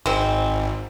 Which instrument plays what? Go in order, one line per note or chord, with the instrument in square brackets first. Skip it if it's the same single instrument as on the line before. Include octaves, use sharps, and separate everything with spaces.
[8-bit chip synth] G#1 [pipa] G#3 C4